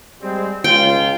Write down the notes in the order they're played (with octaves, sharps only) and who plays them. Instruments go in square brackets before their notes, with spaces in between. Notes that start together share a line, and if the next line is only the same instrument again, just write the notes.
[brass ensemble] G3 G#3 C4
[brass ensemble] C#2 F4 [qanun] G5